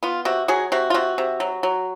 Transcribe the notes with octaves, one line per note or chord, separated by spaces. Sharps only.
B3 F4
C3 F#4
F#3 F#4 G#4
C3 F#4
F4
C3 F#4
C3
F#3
F#3